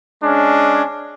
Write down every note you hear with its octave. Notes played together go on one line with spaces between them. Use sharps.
G#3 C#4 D4